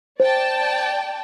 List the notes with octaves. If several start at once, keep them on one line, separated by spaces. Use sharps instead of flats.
C5 D5 G5 A5